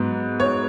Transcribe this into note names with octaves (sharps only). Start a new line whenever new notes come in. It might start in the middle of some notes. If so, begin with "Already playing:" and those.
Already playing: G#2 F#3 B3
C#5